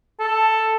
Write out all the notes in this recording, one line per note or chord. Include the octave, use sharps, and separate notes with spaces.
A4